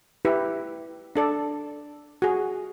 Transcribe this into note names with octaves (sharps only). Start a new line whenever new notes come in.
E4 G4 B4
D4 A4 D5
F#4 G#4